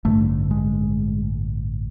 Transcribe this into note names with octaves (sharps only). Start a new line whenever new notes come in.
A1 G2 D3 A3
G#3